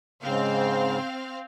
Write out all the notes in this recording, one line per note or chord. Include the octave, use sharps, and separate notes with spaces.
G#2 C#3 C4 F5